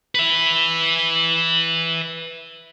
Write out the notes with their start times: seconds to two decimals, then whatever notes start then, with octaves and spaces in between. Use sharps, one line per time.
0.15 B4 E5